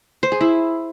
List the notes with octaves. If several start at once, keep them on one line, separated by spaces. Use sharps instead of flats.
C5
G#4
E4